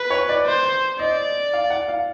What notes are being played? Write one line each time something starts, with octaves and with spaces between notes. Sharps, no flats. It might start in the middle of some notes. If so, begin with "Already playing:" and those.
Already playing: B4
C#5
D5
C5
D5 D#5
F5
F#5
F5